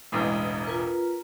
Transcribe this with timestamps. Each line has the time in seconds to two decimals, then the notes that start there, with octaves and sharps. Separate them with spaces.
0.12 E1 A1 E2 G#3 E4 D#5 D#6
0.67 F4 A#4 B4